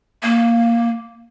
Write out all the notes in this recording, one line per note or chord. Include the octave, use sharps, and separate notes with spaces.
A#3